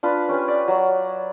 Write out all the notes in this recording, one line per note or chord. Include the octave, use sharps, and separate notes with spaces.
D4 F4 B4
C#4 G4 B4 G#5
D5 G5
F#3